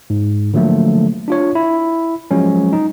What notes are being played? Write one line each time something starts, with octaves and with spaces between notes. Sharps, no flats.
G#2
D3 F3 F#3 A3 A#3
D4 F4 C#5
E4
F3 F#3 G#3 C#4
D#4